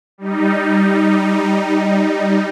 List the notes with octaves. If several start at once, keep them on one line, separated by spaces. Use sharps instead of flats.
G3 D#4